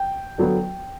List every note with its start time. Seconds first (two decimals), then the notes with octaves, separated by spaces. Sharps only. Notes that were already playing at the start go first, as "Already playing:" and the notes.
Already playing: G5
0.38 D3 F#3 B3